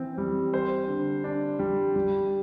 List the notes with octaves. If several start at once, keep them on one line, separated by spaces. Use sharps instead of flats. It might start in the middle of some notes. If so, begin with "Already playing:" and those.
Already playing: E3 C4
G3
C5
D3
D4
G3
G3